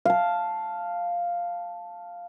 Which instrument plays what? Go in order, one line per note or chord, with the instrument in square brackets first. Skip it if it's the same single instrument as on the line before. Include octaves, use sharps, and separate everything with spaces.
[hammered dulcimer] F5 A5